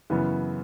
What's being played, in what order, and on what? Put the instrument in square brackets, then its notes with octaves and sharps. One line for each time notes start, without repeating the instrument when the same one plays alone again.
[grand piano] F#2 C#3 E3 B3